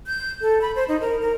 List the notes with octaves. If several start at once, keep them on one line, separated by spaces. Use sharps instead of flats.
G6
A4
B5
C5
D#4
A#4
A#4